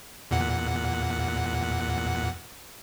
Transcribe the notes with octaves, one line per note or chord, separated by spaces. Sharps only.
E2 A#2 F#5